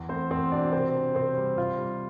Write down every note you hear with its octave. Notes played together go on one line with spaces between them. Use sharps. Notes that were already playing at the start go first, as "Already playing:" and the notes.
Already playing: E2
A3 C4 C5
E2 C4 C5
B2 D4 D5
C3 C4 C5
D4
C3 C4 C5
G3
C3 F4
G3